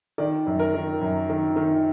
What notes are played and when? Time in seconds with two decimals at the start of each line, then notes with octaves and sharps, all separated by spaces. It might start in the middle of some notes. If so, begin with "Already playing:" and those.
0.18 D#3 D5
0.47 F#2
0.59 A#4
0.74 D#3
1.01 F#2
1.29 D#3
1.56 D#3